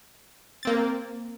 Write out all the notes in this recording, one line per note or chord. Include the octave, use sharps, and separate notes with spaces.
A#3 C4 A6